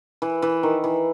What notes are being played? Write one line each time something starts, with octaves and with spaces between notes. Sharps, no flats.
E3
E3
D#3
E3